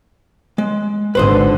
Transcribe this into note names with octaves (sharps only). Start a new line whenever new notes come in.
G#3
G#1 D3 B4 C5 D#5